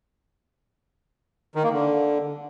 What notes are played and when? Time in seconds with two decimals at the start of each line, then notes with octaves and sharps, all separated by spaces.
1.55 D#3
1.64 A#3
1.72 D3